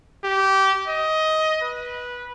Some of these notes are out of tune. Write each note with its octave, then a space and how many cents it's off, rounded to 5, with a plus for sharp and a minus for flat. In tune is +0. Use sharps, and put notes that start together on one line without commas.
G4 -20
D#5 +15
B4 -15